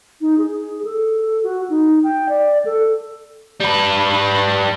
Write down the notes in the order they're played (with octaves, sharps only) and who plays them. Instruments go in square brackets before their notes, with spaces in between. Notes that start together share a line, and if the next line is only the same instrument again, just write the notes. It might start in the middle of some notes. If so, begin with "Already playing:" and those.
[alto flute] D#4
G#4
A4
F#4
D#4
G5
D5
A4
[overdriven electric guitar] G3 B4